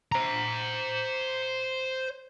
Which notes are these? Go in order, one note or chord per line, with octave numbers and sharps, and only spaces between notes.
C5 A#5